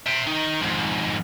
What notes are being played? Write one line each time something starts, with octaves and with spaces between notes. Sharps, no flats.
E5 G5
D#3 D#4
F2 G#2